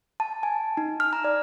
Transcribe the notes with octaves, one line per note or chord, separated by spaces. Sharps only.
A5
G#5
D#4
F6
A#5
D5